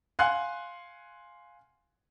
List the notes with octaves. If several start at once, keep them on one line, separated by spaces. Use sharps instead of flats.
F5 F#5 G#5 C6 F#6